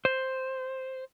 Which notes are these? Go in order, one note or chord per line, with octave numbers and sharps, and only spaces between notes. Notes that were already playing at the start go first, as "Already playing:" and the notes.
C5